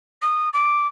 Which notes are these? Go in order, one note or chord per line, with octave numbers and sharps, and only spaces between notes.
D#6
D6